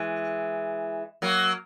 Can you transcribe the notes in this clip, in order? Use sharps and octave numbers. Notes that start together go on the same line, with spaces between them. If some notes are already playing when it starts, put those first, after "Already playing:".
Already playing: E3 G#3
F#3 A#3